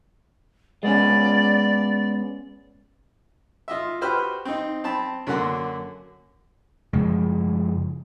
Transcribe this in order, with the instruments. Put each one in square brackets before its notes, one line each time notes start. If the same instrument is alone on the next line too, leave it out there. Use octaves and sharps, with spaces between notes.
[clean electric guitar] G#3 B3 C#4 [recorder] D5
[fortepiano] F4 D#5 E5
F#4 G4 B4 C5 B5 F6
C4 D#4
C4 A5 B5
F#2 D3 A#3 F#5 C6
[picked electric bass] F#2 C#3 F3 G#3